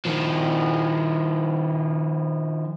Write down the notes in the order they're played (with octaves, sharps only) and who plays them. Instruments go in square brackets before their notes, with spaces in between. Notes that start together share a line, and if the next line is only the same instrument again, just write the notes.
[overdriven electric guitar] D#3 F3